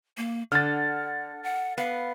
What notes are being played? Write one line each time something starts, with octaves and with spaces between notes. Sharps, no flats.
A#3
D3 F#5 F6 A6
F#5
B3 F5